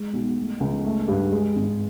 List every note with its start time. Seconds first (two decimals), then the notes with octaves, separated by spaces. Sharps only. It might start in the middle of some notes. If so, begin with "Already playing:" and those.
Already playing: G#3
0.13 B1
0.37 A3
0.60 C#2
0.85 A3
1.08 G2
1.32 G#3
1.56 G#1